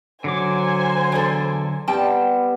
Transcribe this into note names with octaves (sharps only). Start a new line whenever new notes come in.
D3 F#3 C5 G#5 D6
E2 D4 A4
G3 B3 C4 G5 A5